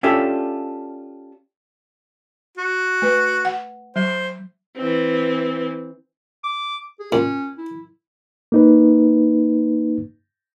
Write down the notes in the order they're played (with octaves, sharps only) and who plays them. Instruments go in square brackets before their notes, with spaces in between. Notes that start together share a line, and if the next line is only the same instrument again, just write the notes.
[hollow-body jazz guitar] C#4 D4 F4 G4 A4 E5
[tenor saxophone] F#4
[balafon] A3 B4
F#5
[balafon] F#3 [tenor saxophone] C5
[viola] E3 C4
[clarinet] D6
G#4
[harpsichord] A#2 [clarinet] C#4
[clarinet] E4
[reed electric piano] A#3 D#4 B4